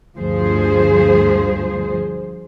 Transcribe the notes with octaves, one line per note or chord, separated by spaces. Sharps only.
D2 G2 F3 G#4 C5